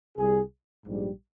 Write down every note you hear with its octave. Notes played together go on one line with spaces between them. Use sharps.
C2 C3 G3 G#4
A#1 G#2 G3